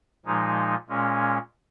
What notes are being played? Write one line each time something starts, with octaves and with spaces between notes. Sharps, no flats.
A#2 F3 G#3 D#4
A#2 G#3 C#4